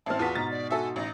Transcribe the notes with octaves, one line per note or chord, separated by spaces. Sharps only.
A1 C4 E4 A5 F6
E2 B3 F4 F#4 B6
G#2 B2 A#5 A6
D5
F#4 A4 E5 G#5
A1 D#4